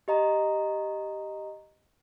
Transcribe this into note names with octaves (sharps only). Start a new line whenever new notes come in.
G4 D#5 A#5